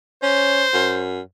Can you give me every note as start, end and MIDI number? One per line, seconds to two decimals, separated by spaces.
0.23 0.64 61
0.23 1.02 72
0.74 1.21 42